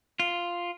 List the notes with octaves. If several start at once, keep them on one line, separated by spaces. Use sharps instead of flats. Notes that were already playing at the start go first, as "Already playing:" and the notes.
F4